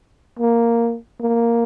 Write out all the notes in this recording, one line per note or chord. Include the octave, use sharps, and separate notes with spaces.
A#3
A#3